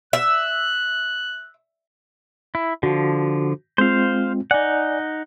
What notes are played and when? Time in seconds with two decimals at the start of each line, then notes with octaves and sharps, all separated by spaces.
0.13 E5 F#6
2.55 E4
2.83 D3 F3 F#4
3.78 G#3 C4 F4 C5 F5
4.51 D#4 D5 F#5 G#5